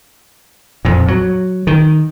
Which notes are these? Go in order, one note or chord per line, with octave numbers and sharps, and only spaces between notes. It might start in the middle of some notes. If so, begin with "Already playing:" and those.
F2 A#2
F#3
D#3